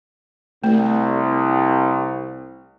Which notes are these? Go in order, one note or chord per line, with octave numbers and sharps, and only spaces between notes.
C2 A3